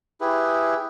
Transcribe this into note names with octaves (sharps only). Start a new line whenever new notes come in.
E4 G4 G#4 B4